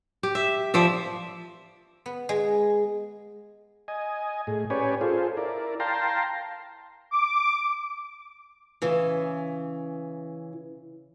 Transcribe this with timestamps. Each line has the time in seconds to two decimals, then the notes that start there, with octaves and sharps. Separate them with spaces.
0.23 G4
0.35 E5
0.74 F3 D5 E5
2.06 B3
2.29 G#3
3.88 D#5 G#5
4.47 A2 G#4
4.70 C#4 G4 B4 C#5 D5 G#5
5.01 F4 G#4 A4 C5
5.37 E4 A#4 D5
5.80 F5 G5 A5 A#5 C6
7.11 D6
8.82 C#3 E3